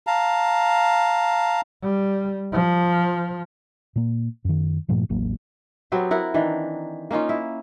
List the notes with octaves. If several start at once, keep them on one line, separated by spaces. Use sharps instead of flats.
F5 A5 A#5
G3
F3
A#2 A#3
F#2 D#3
G2 A#2 F3 A3
E1 A1 F#3 A#3
F#3 B3 C4 G4
E4 A#4 F#5
D#3 E3 D4
A#3 C#4 D#4 F4
E4